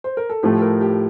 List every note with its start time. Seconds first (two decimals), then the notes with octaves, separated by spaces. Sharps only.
0.04 C5
0.17 A#4
0.30 A4
0.43 A2 F3 A3 G4
0.62 A#4
0.81 G4